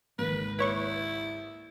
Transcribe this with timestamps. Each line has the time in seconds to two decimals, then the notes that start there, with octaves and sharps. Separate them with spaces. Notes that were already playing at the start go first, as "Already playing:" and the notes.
0.19 G#1 C#2 D#3 A#3 B4
0.59 E4 B4 C#5 C#6